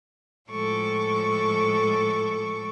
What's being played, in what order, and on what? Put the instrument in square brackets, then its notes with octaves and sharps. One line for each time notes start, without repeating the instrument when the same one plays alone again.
[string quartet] A2 F3 G#3 A4 C#6 D6